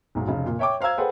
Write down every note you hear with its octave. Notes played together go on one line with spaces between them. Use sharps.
B1 G#2
F1 C#3
A#2
C#5 E5 G5 C#6 D6
C5 F5 A#5 E6 G#6
G#4 A4 B4 C5 F#5 G5